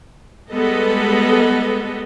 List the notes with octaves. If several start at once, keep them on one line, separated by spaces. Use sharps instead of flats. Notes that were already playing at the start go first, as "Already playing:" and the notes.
G3 G#3 B3 A4 D#5